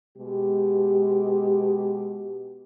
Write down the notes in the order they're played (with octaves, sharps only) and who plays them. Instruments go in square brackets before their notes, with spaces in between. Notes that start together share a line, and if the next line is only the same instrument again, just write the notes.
[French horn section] B2 G#3 G4